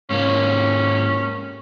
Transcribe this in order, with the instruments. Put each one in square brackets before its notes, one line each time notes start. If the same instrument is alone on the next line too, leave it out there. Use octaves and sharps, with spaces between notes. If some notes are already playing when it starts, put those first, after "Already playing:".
[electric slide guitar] G#2 A#3 [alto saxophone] C#4